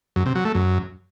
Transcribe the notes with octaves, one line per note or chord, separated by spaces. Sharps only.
F#2
C3
F#3
A3
F#2